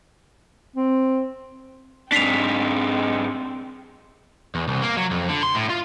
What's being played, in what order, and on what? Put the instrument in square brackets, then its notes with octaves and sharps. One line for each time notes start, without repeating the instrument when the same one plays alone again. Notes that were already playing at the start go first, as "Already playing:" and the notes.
[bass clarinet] C4
[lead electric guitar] G#2 D4 [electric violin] C4 [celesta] B6 C7 F7
[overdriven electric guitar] E2
C2
A#3
F#3
F2
D3
C6
A2
F4